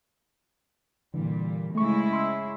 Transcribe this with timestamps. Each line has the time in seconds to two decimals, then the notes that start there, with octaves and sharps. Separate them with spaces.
1.14 A#2 D3 E3 G3
1.75 C#3 G#3 A3 E4 C#6
2.13 C6 C#6 E6